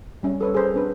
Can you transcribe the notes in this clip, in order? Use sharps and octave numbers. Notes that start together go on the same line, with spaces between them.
G3 C#4
A4 B4 C#5
G#4 C5 A#5
C4 D4 B4